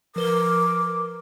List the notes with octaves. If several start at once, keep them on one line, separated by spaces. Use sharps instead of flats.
F3 A#4 B4 D6 G7